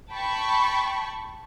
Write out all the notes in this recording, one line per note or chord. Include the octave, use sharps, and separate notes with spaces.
G5 A5 B5 C#6